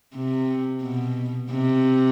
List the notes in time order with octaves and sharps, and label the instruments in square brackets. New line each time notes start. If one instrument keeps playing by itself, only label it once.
[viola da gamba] C3
B2
C3